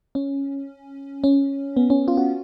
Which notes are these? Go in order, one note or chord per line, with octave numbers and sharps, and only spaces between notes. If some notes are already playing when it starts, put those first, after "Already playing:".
C#4
C#4
B3
C#4
F4
F#4